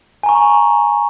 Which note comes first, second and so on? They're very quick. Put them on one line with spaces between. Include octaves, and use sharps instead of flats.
G#5 A#5 C#6